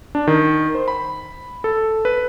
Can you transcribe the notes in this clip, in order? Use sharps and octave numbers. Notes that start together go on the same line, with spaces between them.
D4
D#3
C5
B5
A4
B4